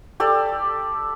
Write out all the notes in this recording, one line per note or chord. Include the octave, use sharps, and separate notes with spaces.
G4 A4 D5